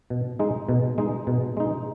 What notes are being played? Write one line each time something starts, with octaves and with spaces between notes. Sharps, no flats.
B2
G#3 D#4
B2
G#3 D#4
B2
G#3 D#4